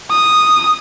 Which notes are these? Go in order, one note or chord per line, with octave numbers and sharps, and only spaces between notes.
D#6